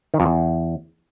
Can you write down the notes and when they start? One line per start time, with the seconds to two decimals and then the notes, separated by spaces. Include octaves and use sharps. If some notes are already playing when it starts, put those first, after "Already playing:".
0.14 D#3
0.20 F2
0.26 E2